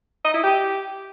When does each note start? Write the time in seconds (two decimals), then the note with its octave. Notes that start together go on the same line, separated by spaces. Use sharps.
0.24 D#5
0.34 E4
0.44 G4